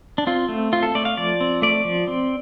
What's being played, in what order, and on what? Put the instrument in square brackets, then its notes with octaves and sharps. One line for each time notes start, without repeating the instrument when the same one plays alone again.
[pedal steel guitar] D4
C4 F4
A3
C4 F4
A4
A3 D5
F5
F3 D5
C4
A3 D5
F3
C4